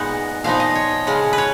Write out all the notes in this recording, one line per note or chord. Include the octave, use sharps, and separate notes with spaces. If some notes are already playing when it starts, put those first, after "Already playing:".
Already playing: A#2 G#3 B3 D#4 F#5
A#2 F3 B3 D#4 F5
D#5
C#5
C#3 G#3 C#4
B4
C#5